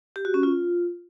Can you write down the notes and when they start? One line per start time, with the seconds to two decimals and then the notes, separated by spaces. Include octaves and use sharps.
0.16 G4
0.25 F#4
0.34 C#4
0.43 F4